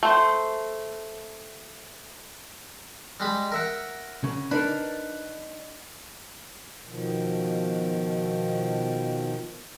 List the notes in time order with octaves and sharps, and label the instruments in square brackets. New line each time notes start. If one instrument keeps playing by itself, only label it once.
[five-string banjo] A3 C5
[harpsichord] G3 G#3 B5
A#4 E5 F#5
[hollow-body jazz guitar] C#3
[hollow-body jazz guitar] D4 D#4 A#4 [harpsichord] B4
[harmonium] B2 D#3 F3